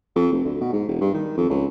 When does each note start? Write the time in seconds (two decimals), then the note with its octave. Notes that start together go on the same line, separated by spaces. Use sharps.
0.16 F2
0.32 F1
0.45 D2
0.61 B2
0.73 G#2
0.88 E1
1.01 G2
1.14 D#3
1.38 F2
1.50 C#2